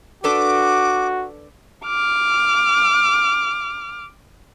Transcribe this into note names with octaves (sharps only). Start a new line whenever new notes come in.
D4 F#4 A4 B4 D6
D6 F6